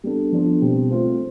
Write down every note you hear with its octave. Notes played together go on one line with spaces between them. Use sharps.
G3 B3 D4 A4
F3 B3 D4 F4 A4
B2 G3 C4
A3 C4 F4 C5